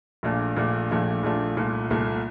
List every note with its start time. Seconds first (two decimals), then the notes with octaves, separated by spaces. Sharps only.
0.23 A#1 A#2 A3 D4 F4
0.56 A#1 A#2 A3 D4 F4
0.90 A#1 A#2 A3 D4 F4
1.23 A#1 A#2 A3 D4 F4
1.57 C2 A#2 A3
1.90 C2 A#2 A3